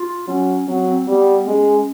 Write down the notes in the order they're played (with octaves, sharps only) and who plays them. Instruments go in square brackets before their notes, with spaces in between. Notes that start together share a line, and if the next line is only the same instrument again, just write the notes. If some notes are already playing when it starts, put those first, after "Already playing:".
Already playing: [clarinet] F4
[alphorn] F#3 [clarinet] C#4
[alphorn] F#3 [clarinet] C4
[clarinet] C4
[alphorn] G3 [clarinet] B3
[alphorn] G#3 [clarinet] C#4